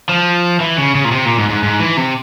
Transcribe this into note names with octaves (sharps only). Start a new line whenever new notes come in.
F3
E3
C#3
C#3
A#2
C3
A#2
G#2
G#2
G#2
E3
C3